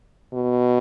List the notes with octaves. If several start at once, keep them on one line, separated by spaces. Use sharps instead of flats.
B2